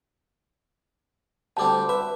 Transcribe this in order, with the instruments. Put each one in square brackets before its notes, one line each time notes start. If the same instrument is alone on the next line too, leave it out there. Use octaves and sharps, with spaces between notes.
[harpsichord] D2 G3 C4 [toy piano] A5 D6
[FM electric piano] B4 [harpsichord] E5